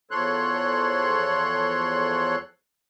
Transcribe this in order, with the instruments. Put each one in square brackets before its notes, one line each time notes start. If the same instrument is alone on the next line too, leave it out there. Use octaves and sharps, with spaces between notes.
[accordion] E2 F3 A4 C#5 C6 F#6